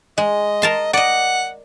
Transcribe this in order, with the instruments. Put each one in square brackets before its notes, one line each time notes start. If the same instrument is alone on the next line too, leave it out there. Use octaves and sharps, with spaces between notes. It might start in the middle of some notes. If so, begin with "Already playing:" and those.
[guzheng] G#3 [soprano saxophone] D#5
[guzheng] A#4 A5 C6
[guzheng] D5 D#5 [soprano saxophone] F#5